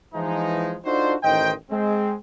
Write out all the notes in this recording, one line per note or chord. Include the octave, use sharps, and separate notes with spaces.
E3 F3 G#3 D#4
D4 D#4 F4 F#4 A4 C5
A1 D#3 D#4 C5 D#5 G5
G#3 C4